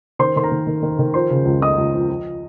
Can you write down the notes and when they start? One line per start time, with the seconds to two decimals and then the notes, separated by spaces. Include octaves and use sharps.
0.19 D#3 C5 C6
0.36 D#3 C6
0.44 A#4 A#5
0.52 D#3
0.67 D#3
0.83 D#3
0.99 D#3
1.14 F3 C5 C6
1.30 C#3
1.45 C#2
1.61 C#2 D#5 D#6
1.78 C#2
1.94 F3
2.09 F3